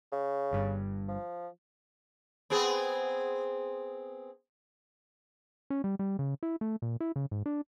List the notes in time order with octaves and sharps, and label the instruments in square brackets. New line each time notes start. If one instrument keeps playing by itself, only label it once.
[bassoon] C#3
[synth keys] G1 G2
[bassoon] F3
[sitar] B3 C4 G#4
[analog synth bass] C#4
G3
G3
C#3
E4
A3
A#2
E4
C#3
G#2
D4